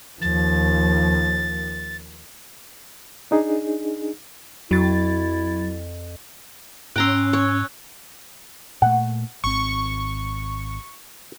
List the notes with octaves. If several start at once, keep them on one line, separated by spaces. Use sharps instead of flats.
D#2 F3 A6
D4 D#4 G#4
F2 F#3 E4 A6
G#2 C#4 G5 A#5 C6 E6 F#6
C#5
A#2 A3 F#5
G#1 C4 C#6